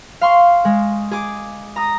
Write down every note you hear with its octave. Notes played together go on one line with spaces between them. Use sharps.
F5 C6 C#6
G#3
G#4 D6
A#5 D#6